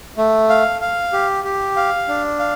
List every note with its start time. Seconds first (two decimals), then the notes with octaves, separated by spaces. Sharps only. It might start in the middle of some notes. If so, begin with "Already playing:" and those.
0.17 A3
0.50 F5
0.81 F5
1.12 G4
1.44 G4
1.76 F5
2.08 D4
2.39 F5